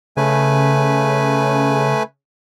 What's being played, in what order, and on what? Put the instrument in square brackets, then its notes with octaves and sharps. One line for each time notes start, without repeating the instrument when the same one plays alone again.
[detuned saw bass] C#3 [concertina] A3 B4 G#5